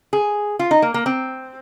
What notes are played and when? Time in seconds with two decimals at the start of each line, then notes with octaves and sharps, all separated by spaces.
0.13 G#4
0.59 F4
0.71 D#4
0.82 A#3
0.94 A#3
1.06 C4